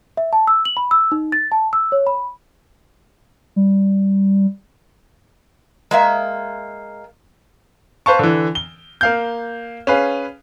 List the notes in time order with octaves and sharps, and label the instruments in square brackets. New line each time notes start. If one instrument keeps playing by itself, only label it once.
[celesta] E5
A5
E6
F#7
B5
E6
D#4
A6
A5
E6
C#5
B5
[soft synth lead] G3
[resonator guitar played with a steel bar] G#3 A#3 E5
[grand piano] B4 C5 F5 A5 C#6
D3 E3
G7
A#3 F5 G6
C#4 G#4 B4 F5